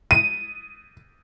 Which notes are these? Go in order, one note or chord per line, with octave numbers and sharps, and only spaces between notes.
D#7